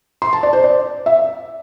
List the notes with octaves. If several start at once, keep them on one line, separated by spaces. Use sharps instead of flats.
C6
A5
D5
C5
D5
E5